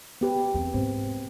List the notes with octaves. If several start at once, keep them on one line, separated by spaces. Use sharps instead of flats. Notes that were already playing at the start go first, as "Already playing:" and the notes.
B3 G4 B4
E2 C4
G#2 C3 C4